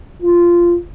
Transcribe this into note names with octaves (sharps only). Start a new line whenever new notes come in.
F4